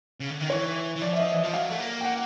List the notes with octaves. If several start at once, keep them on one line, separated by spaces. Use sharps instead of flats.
C#3
D3
D#3
E3 C#5
E3
F3 D5
E5
D#5
E3 E5
F3
F#3 F5
A3
A#3
G5
F#5